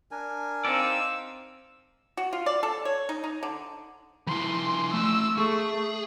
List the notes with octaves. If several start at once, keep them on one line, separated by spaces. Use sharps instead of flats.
D4 A#4 G#5
C4 D#4 G4 D5 F5 E6
F#4
F4
D5
A4
C#5
D#4
D#4
D3
F3 E4 C6
A3 C6 E6
A3 G#4 C#6